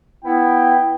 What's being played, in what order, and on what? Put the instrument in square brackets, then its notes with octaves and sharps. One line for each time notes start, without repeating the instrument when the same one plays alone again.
[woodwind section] B3 E4 [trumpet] G5